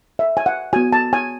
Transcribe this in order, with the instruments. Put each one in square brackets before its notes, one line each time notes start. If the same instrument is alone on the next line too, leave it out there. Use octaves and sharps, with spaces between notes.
[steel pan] E5
G#5
F#5
B3 F#4 G#5
A5
G#5